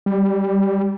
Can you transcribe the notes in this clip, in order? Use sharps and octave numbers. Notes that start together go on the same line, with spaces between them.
G3